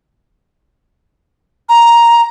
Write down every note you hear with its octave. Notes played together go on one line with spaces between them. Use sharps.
A#5